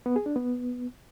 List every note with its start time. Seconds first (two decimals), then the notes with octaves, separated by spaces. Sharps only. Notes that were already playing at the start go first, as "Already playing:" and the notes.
0.06 B3
0.16 G#4
0.26 D4
0.36 B3